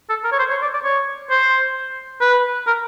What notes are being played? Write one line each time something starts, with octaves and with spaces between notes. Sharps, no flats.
A4
A#4
C#5
C5
C#5
D5
D5
C#5
C5
B4
A#4